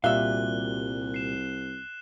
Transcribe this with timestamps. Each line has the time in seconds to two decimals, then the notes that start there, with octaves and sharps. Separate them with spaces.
0.04 C2 A#2 G3 F#4 E5 F5 F#6 G7
1.14 C7 E7